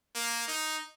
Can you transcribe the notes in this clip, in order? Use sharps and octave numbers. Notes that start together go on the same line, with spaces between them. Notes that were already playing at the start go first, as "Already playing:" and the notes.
A#3
D#4